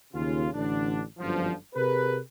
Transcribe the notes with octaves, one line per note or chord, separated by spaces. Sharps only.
D#2 C#3 F4
A1 D3 D4
G1 F#2 D3 F3
C3 G#4 A#4 B4